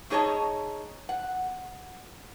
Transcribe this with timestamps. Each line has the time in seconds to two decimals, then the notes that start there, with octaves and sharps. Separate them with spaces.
0.10 A3 D#4 G#4 C#5 D#5 A5
1.09 F#5